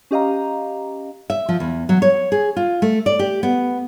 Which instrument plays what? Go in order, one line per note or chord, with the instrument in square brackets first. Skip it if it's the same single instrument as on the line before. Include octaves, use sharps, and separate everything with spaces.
[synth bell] C#4 G4 D#5 F5 A#5
[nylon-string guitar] E5
F3
E2
F#3
C#5
G#4
F4
A3
D5
G4
B3